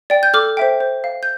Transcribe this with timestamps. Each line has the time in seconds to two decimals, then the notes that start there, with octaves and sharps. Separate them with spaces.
0.10 D5 G5
0.23 G6
0.34 A4 D6 F6
0.57 C5 E5 G5
0.81 C5
1.04 F5
1.23 G6